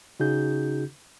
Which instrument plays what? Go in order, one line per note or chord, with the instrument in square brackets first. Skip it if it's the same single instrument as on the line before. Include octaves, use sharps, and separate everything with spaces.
[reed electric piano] C#3 C#4 D#4 F#4 G#4 G6